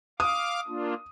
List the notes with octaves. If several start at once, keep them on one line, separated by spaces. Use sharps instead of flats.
F5 D6 D#6
A#3 D4 F4